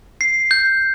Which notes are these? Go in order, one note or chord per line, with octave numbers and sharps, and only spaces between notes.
C7
G6